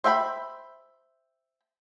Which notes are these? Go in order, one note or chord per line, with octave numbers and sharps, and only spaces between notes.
C5 E5 G5 A#5 B5